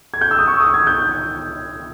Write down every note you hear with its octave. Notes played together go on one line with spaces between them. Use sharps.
G#6
G6
E6
D#6
C#6
D#6
G#6
G6